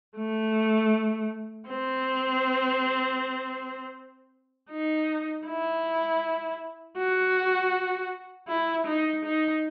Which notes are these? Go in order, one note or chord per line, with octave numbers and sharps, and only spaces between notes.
A3
C4
D#4
E4
F#4
E4
D#4
D#4